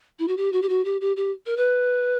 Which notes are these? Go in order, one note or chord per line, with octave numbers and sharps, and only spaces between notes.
E4
F#4
G4
F#4
G4
F#4
G4
G4
G4
A#4
B4